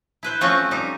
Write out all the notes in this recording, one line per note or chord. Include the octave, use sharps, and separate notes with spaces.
E4 B4 C5
F3 A3 C4 C#4 F4 F#4
G3 D#4